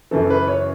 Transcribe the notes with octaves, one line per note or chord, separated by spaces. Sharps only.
F#2 C#3 E3 A4
B4
C#5